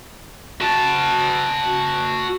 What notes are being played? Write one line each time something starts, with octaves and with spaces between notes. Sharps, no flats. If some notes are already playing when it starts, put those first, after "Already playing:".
F#4 A5